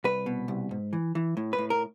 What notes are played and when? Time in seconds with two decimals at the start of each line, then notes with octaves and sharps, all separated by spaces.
0.04 C2 B4
0.26 B2
0.48 C2
0.71 G#2
0.93 E3
1.15 E3
1.37 A2
1.53 B4
1.58 A2
1.70 A#4